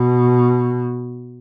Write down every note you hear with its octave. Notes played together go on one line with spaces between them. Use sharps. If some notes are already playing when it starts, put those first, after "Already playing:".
Already playing: B2